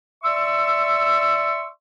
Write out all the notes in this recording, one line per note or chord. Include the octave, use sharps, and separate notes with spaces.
D5 E5 C6 C#6 E6